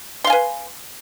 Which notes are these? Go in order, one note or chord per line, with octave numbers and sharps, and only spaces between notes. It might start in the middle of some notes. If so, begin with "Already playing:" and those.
B4 F5 G#5 C6